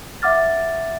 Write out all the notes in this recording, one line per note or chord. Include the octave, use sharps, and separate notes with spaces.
E5 F#5 D6 F6 A6